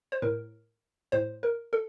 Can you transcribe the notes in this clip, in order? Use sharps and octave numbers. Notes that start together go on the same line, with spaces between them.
C5
A2 A#4
A2 C5
A#4
A4